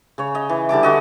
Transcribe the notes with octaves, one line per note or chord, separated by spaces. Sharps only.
C#3 C#5
D#5
E3
D3 G3 A5 D6
D3 F#4 D#5